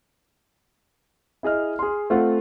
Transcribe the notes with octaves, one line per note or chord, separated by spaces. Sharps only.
E4 G#4 D#5 F6
G#4 C6
A3 C4 F4 F#5